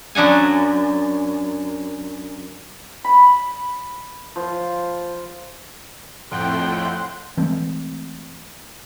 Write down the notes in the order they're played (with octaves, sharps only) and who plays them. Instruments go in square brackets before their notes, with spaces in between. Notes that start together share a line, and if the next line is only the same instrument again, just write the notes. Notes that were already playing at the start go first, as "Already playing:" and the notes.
[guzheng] F#2 D4 F#5 G#5
[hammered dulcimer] B5
F3
[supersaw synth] F2 A2 G5 [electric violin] F#5 C6
[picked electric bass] E3 G#3 A3 C4